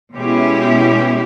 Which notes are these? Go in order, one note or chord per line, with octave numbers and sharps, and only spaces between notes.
B2 G#3 C#4 E4 G4